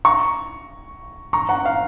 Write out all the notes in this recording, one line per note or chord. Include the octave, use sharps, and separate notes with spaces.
A#5 C#6
A#5 C#6
F#5 A#5
F5